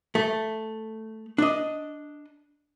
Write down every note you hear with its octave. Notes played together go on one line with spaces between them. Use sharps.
A3
D4 D#5